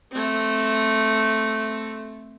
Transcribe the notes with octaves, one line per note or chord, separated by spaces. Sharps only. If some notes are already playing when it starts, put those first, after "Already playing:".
A3 C4